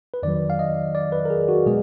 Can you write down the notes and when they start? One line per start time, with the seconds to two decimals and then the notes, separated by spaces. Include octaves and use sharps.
0.14 B4
0.23 F2 D#3 F#3 D5
0.50 F5
0.59 D#5
0.95 D5
1.12 B4
1.25 A#4
1.30 G#4
1.48 F#4
1.66 B2 G#3 G#4